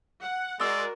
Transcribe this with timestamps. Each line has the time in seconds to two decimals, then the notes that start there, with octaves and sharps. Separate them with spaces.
0.22 F#5
0.60 G#3 F#4 A#4 D5 C6 E6